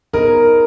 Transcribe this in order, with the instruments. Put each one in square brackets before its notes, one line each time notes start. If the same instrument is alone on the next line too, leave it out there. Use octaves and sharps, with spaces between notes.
[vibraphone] B3 D#4 G#4 C5 D#5 [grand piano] A#4